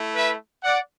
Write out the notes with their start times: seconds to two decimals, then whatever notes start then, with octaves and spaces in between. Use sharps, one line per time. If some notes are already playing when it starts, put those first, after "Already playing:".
Already playing: A3 E4
0.16 B4 E5
0.64 D5 F#5